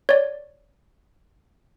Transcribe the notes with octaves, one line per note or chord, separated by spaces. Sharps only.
C#5 D5